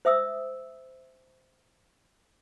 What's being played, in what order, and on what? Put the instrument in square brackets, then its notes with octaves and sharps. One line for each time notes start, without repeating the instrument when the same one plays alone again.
[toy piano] C5 E5 D#6 E6